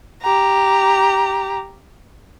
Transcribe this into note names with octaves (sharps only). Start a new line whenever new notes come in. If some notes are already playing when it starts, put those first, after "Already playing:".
G4 A#5